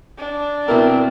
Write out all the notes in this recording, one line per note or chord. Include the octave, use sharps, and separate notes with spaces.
D4
B2 C4 E4 A#4